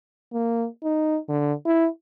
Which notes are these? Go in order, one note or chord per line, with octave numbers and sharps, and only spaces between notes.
A#3
D#4
D3
E4